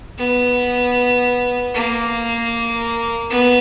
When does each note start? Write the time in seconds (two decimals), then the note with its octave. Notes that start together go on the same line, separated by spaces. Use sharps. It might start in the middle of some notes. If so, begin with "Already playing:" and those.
0.18 B3
1.74 A#3
3.30 B3